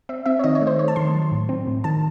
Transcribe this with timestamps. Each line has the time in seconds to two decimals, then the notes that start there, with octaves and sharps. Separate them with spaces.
0.09 C4 E5
0.26 C4 E5
0.39 C#5
0.44 D#3 D#5
0.55 C#5
0.62 A3
0.67 C5
0.79 A3 C#5
0.88 A5
0.96 D#3 C6
1.15 F#3
1.32 A2
1.49 C4
1.67 A2
1.84 D#3 A5